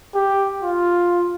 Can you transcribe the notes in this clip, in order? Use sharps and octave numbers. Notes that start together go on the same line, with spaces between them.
G4
F4